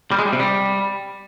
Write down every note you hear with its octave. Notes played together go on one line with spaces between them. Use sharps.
G3
G#3
G3
C3
G3